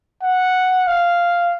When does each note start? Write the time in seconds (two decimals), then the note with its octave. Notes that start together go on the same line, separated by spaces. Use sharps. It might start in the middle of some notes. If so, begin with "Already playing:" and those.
0.23 F#5
0.87 F5